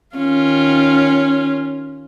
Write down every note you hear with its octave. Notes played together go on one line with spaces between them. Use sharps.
D#3 C#4 F4